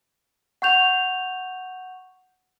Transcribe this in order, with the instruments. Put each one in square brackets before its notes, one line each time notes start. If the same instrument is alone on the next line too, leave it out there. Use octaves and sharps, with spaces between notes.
[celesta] F#5 C#6 G6 F7